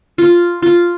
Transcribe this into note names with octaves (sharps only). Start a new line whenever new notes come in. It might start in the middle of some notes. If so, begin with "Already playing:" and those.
F4
F4